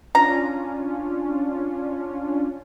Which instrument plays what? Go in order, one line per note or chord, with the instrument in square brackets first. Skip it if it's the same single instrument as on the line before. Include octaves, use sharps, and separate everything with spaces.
[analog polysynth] C#4 D4 F4 [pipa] A#5